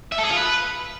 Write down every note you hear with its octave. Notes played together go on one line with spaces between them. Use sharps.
E5
A4
G#4
F4
B4